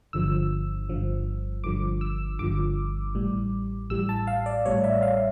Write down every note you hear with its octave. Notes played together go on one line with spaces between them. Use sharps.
G1 G2 D3 F3 E6
G1 G2 D3 F3
G1 G2 D3 F3 D6
E6
G1 G2 D3 F3 D6
A1 A2 G3
A1 A2 G3 E6
A5
F5
D5
A1 A2 G3 C#5
E5
F5